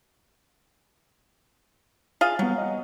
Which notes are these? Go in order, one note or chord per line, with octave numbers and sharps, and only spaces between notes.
F4 G#4 F5
F#3 G3 B3
D#5 F#5